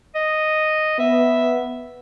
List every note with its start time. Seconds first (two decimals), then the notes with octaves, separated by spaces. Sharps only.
0.15 D#5
0.99 B3 E5